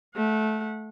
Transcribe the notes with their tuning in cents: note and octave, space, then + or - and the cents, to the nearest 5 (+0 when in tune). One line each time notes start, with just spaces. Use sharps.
A3 -20 F#5 -25